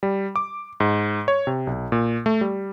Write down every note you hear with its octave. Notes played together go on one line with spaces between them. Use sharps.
G3
D6
G#2
C#5
C3
B1
A#2
A3
G3